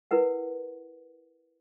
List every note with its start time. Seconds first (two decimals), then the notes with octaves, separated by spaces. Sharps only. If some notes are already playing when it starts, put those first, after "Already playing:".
0.11 E4 A#4 B4 F#5